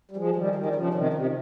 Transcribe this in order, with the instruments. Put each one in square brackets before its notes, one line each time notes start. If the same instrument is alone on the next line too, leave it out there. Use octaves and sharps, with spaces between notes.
[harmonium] G3
F3 G#3
D#3 G3
D#3 G3
G3
C#3 F3
C3 D#3
C3